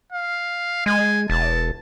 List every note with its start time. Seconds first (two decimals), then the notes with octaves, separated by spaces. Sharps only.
0.13 F5
0.86 G#3 G#5
1.30 E1 A5